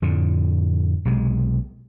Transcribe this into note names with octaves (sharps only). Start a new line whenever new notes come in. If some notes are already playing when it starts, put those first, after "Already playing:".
F2 A2 D3
B1 C3 G#3